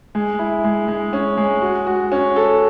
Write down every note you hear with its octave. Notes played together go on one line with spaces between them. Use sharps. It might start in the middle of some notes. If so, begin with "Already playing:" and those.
G#3
E4
G#3
G#3
C#4
G#3
F#4
F#4
C#4
A4